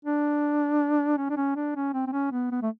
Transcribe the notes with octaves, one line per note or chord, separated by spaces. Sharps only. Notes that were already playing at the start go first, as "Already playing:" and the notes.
D4
C#4
D4
C#4
D4
C#4
C4
C4
C#4
B3
B3
A3